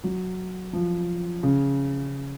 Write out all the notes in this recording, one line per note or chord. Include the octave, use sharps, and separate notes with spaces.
F#3
F3
C#3